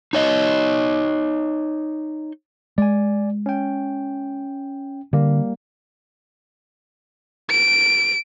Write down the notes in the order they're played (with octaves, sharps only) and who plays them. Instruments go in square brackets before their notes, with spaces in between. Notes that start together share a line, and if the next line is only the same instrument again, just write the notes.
[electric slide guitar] D#4 C#5 D#5
[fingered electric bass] G#3 [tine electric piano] D5 G#5
[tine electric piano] C#4 G5
[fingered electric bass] D3 [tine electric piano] G3 A#3
[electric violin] D7